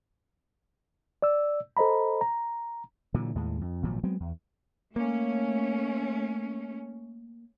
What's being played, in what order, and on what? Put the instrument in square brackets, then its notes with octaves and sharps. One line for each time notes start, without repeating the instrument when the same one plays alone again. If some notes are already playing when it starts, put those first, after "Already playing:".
[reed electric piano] D5 E6
A4 C5 D#5 A#5 B5
A#5
[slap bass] A#2 D3 E3 F#3
D#2 A2 G#3
F2
G#1 A#2 F3 F#3
F#3 G#3 B3 C4
E2
[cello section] A3 C#4 [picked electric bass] A#3